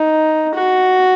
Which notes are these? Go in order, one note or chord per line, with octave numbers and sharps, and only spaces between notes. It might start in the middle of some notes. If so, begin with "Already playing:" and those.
Already playing: D#4
F#4